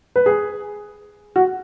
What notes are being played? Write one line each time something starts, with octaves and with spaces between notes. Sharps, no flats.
B4
G#4
F#4